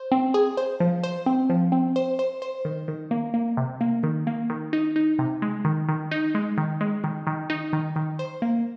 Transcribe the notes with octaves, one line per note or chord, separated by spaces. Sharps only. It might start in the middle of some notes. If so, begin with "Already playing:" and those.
Already playing: C5
C4
G#4
C5
F3
C5
C4
F3
C4
C5
C5
C5
D#3
D#3
A#3
A#3
C3
A#3
D#3
A#3
D#3
D#4
D#4
C3
G#3
D#3
D#3
D#4
G#3
D#3
G#3
D#3
D#3
D#4
D#3
D#3
C5
A#3